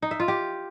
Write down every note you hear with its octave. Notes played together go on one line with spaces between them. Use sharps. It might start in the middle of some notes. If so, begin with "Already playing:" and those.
D#4
E5
F4
G4